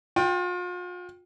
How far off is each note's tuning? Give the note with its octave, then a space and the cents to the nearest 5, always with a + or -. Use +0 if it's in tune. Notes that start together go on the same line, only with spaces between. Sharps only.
F4 +40 G5 +0